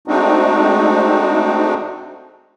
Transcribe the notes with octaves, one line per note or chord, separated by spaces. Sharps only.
G#3 A3 C4 D4 D#4 F#4